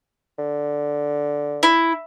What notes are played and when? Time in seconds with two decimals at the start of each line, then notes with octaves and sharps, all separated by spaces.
0.39 D3
1.63 E4